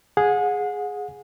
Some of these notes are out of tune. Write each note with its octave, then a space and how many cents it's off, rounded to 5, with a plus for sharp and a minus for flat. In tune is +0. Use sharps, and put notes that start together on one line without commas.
G#4 +0 F#5 -35